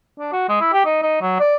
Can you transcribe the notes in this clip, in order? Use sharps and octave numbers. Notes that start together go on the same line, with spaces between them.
D4
F#4
G#3
E4
G4
D#4
D#4
F#3
D5